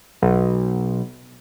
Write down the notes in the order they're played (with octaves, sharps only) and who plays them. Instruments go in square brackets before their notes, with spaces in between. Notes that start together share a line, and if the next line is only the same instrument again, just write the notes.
[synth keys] B1